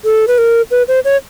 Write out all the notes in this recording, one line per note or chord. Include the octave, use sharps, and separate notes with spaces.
A4
B4
A#4
B4
C5
C#5